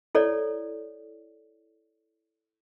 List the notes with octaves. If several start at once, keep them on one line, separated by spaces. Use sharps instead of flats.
E4 A4 C#5 D5